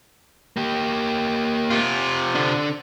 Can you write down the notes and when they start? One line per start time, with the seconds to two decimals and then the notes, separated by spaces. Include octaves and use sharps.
0.57 A#3 G4
1.70 C3 F4
2.35 D3 D4